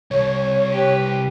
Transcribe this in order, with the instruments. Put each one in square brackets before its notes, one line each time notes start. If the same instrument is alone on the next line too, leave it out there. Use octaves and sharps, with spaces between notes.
[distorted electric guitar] C2 [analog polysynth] C#5
[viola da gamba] G4 B4